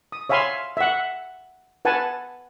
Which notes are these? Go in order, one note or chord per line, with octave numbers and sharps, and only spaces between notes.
D#6
C#5 E5 F5 G#5 B5 C6
E5 F#5
B4 F#5 G#5 A5